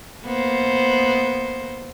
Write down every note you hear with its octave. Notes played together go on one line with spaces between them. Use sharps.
A#3 B3 C5